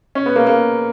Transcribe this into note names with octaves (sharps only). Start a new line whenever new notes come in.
C#4
B3
A#3
A#3